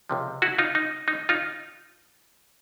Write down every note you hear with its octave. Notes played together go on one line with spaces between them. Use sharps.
C#2 C3 F3
E4 F#4
D#4 F4
D#4
D#4
D#4 F4